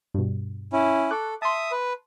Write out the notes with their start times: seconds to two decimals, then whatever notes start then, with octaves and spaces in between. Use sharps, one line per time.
0.14 G2 B2
0.73 C#4 E4
1.11 A4 C#6 D6 F#6
1.42 E5 A5 C6 D#6
1.72 B4